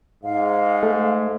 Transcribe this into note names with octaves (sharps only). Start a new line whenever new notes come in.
G#2 F5
A3